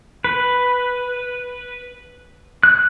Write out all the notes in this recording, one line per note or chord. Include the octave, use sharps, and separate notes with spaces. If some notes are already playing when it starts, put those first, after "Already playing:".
B4
F#6